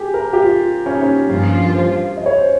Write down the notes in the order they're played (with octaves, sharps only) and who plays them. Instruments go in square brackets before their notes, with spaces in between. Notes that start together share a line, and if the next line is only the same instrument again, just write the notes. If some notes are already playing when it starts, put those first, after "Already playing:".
Already playing: [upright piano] G4 G#4
A#4
G4
F4
C#4
D#4
C#4
[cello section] G2 F3 A#3 F4 [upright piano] C#4
[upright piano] C5
D#5
C#5
C5